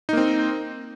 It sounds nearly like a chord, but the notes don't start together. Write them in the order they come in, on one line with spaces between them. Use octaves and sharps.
D#4 A#3 C4